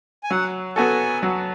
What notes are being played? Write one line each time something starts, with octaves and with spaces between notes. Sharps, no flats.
G#5
F#3 F#5
B3 F#4 A4 G#5
F#3